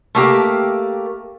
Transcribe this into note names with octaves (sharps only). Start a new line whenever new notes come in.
A3 A#3 G4